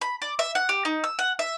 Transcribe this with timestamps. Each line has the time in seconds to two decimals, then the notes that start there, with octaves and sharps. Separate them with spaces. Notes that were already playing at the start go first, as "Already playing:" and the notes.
0.01 B5
0.22 D5
0.39 E5
0.55 F#5
0.69 G4
0.85 D#4
1.04 E6
1.19 F#5
1.39 E5